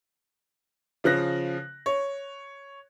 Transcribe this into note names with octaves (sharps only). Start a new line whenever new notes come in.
C#3 F3 F#6 A#6
C#5